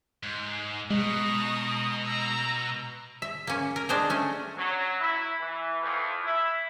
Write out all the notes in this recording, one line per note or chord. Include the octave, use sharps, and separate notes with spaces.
G#2
B2 G#3 A#5 C#6 D#6
A#5 E6
E5
A#3 C#4
A#4
D4 G#4 C5 D#5 A#5
A3 C#4
F#3
E4
E3
F2
E4